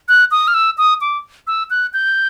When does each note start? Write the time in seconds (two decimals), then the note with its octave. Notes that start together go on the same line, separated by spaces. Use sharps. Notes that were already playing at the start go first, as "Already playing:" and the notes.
0.09 F#6
0.31 D#6
0.48 F6
0.54 E6
0.78 D#6
1.01 D6
1.47 E6
1.70 F#6
1.94 G6